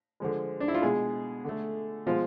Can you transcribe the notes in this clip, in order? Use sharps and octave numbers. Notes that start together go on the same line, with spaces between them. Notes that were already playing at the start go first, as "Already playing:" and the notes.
D3 F3 G#3
D4
E4
F4
B2 G#3 G#4
D3 A3
B2 F3 G#3 F4